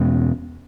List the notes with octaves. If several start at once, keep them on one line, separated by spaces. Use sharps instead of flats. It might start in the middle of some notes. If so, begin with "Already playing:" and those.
Already playing: E2 B2 G#3 C#4